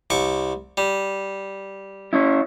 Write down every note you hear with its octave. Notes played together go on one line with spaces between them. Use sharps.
C2 C#6 D6
G3
C#4 E4